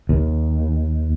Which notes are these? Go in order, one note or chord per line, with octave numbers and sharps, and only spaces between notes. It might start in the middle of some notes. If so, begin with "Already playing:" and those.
D#2